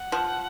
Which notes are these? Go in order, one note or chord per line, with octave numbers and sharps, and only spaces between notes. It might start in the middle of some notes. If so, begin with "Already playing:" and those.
Already playing: F#5
F3